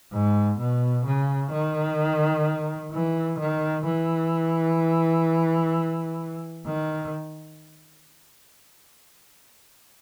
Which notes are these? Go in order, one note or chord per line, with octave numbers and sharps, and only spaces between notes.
G#2
B2
C#3
D#3
E3
D#3
E3
D#3